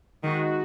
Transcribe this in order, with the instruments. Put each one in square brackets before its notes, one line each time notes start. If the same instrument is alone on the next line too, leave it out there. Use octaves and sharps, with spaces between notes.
[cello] D#3 [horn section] G#3 D#4 F#4